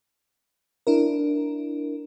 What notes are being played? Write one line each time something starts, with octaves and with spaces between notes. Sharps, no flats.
D4 E4 A#4